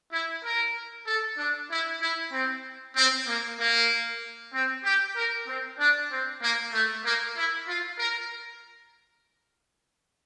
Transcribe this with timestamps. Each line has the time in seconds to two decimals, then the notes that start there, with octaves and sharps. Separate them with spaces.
0.12 E4
0.44 A#4
1.07 A4
1.38 D4
1.70 E4
2.01 E4
2.33 C4
2.96 C4
3.28 A#3
3.59 A#3
4.53 C4
4.85 G4
5.16 A#4
5.48 C4
5.79 D4
6.11 C4
6.42 A#3
6.73 A3
7.05 A#3
7.37 E4
7.68 F4
7.99 A#4